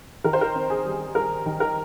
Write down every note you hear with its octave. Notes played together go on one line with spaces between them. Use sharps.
D#3 A#4
C5
A#4
C4
G#4
G3
G3 A#4
D#3
A#4